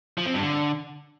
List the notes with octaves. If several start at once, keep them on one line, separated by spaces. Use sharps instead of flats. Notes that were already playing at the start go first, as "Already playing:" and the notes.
F3
C4
G2
D3